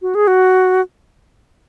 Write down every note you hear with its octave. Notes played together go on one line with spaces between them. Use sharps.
F#4
G#4
F#4